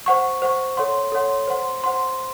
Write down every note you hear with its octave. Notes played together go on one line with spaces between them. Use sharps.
C5 F#5 C#6
C5 F#5 C#6
A4 C#5 F#5 C6
A4 C#5 F#5 C6
C5 F#5 C6
C5 F#5 C6